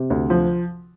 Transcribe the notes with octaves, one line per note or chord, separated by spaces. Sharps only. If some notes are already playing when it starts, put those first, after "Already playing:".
Already playing: C3
D2
F3